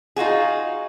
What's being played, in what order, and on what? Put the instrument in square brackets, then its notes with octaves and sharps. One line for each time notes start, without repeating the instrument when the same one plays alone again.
[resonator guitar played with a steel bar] D#4 F4 F#4 G#4